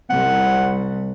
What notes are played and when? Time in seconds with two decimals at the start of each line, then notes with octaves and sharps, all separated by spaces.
0.10 C2 F#5